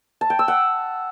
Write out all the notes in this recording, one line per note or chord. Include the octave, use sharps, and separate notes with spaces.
A5
G5
E6
F#5